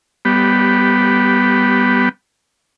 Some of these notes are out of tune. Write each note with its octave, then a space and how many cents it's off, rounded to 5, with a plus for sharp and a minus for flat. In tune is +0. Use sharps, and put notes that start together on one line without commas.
G3 +0 B3 +0 G4 -20